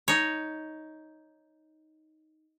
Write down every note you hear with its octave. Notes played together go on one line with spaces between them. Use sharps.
D#4 C#5